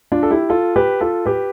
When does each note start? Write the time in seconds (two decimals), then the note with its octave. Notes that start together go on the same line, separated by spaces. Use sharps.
0.12 D4 F4
0.23 A4
0.31 E4 G4
0.50 F4 A4
0.76 G4 B4
1.01 F4 A4
1.26 G4 B4